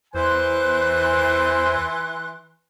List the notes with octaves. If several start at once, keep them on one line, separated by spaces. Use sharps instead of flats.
E2 E3 C5 G#5 C6 F#6